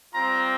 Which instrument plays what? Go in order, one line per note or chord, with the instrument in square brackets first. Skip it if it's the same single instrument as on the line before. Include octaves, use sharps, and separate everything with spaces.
[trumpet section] G3 C4 F4 A#5